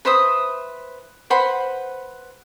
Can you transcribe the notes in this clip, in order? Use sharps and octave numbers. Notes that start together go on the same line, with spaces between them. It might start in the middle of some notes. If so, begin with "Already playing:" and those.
B4 C5 E5 D#6
B4 C5 F#5 B5